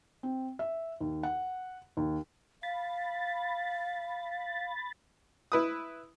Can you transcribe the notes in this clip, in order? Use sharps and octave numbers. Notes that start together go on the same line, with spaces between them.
C4
E5
D#2
F#5
D#2
F5 B5 A6
E4 B4 D#6